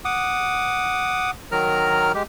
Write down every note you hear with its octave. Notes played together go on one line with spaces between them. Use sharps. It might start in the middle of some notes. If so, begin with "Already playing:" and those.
F#5 D6 D#6
D#3 F#3 A#4 A#5 F6
G#3 G4